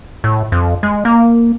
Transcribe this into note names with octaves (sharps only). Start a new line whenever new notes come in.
A2
F2
G#3
A#3